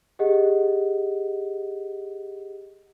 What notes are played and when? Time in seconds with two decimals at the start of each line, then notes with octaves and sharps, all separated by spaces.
0.19 G4 G#4 D#5 F#5